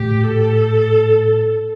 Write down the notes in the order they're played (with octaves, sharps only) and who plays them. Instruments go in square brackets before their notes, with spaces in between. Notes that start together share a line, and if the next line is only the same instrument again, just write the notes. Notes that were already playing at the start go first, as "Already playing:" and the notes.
Already playing: [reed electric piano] A2 [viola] G4
[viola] A4